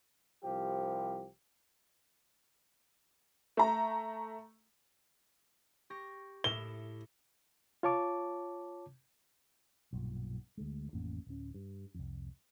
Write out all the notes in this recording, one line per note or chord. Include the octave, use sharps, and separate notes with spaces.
C2 F3 G4
A3 A#5
G4 C#6 A#6
A2 E4 E7 G7
F4 C#5 A5 D6
B1 G2 A#2
D2 G#3
A1 F2 A#3 C#4
D1 C#4
G2
C2 F2